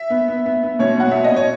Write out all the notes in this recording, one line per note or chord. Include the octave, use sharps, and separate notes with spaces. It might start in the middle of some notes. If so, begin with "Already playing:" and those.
Already playing: E5
B3
B3
B3
B3
B2 C#5
B2 F#5
B2 E5
D#5
B2
C#5